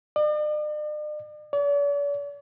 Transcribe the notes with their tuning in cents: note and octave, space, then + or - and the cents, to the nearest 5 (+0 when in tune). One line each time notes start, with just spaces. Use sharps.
D5 +45
D5 -45